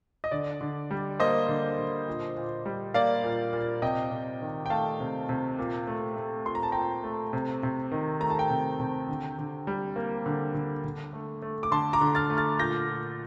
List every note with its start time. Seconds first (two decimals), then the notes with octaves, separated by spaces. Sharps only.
0.24 D#5
0.31 D3 D5
0.61 D3
0.91 G3
1.20 A#3 C5 D#5
1.49 D3
1.79 D3
2.08 A#2
2.37 A#2
2.66 G3
2.94 A#3 D5 F5
3.24 A#2
3.53 A#2
3.82 C3 D#5 G5
4.11 C3
4.41 D#3
4.66 G5
4.70 A3 F5 A5
5.00 C3
5.29 C3
5.59 A#2
5.87 A3
6.16 A3
6.46 A#2 C6
6.55 A#5
6.63 A5
6.72 A#2 G5 A#5
7.04 A3
7.33 C3
7.63 C3
7.92 D#3
8.20 A3 A#5
8.30 A5
8.38 G5 A#5
8.50 C3
8.80 C3
9.08 D3
9.38 D3
9.67 G3
9.96 A#3
10.26 D3
10.54 D3
10.84 D3
11.13 A3
11.42 A3
11.63 D6
11.71 D3 A5 C6
11.93 A#5 D6
12.01 D3
12.15 F6 A6
12.30 A3
12.37 F6 A6
12.59 A#2 G6 A#6
12.88 A#2